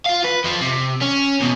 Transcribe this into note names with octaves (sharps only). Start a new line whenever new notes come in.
F4 F5
B4
F2 F3
C3
C#4
E2 B2